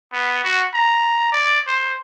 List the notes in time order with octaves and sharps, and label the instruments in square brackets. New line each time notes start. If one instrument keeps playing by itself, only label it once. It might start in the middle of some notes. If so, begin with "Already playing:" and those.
[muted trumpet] B3
F#4
A#5
D5
C5